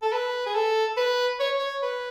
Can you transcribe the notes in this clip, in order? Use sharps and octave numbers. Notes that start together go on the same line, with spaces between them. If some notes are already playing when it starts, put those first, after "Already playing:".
A4
B4
G#4
A4
B4
C#5
C#5
B4